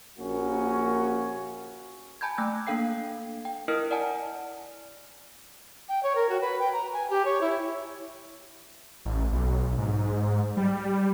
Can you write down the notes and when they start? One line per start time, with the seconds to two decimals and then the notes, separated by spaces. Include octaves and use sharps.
0.19 A#1 A#3 C#4 F#4
2.21 G#5 A5 B5 G6 G#6
2.38 A3 G5 E6 F#6 G#6
2.67 A#3 D4 A4 F5 G5 C7
3.45 G5
3.68 E4 A#4 D#5 D#6 F6 D7
3.91 D5 F#5 G#5 A5
5.89 G5
6.03 C#5
6.16 A#4
6.29 F#4
6.41 B4
6.60 G5
6.73 A#5
6.93 G#5
7.10 G4
7.25 C#5
7.41 E4
9.05 A1
9.32 B1
9.78 G#2
10.57 G3